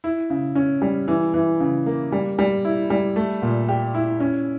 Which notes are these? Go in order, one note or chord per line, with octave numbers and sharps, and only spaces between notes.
E4
C#3
C#4
G3
E3
E3
C#3
A#3
G3
G3
E4
G3
A3
A#2
G4
E4
C#4